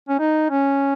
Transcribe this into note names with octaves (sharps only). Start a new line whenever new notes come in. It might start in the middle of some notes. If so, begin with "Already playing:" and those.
C#4
D#4
C#4